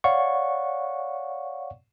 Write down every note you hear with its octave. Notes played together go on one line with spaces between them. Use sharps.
C#5 D5 F5 F#5 C#6